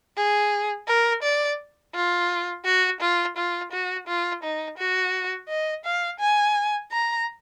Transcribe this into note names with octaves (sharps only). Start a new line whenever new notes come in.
G#4
A#4
D5
F4
F#4
F4
F4
F#4
F4
D#4
F#4
D#5
F5
G#5
A#5